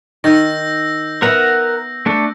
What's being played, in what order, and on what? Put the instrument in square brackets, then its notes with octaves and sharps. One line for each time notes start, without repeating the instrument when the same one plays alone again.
[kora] D#3 [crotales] E6 G6 A#6
[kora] B3 B4 E5 [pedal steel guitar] A#4 F#5 A#5
[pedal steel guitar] A3 D4 A4